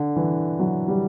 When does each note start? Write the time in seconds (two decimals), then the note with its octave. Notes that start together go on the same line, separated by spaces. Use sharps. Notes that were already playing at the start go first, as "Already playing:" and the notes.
Already playing: D3
0.16 E3
0.59 F#3
0.88 G3